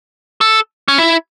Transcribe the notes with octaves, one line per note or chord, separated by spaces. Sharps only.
A4
C#4
E4